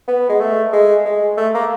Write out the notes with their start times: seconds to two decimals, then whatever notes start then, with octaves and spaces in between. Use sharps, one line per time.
0.08 B3
0.29 G#3
0.40 A3
0.73 G#3
1.06 G#3
1.37 A3
1.54 A#3